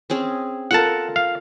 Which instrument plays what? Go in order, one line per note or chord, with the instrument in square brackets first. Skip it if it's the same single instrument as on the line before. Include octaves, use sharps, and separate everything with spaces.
[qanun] C4 C#4 G#4
[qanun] F4 A4 A#4 [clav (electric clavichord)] F#5 A5
[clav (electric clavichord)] F5